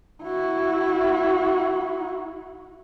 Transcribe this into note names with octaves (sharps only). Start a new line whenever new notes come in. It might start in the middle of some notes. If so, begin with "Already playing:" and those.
E4 F#4